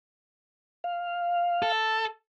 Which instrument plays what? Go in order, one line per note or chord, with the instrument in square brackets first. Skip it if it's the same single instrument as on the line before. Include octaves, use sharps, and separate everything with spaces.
[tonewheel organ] F5
[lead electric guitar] A4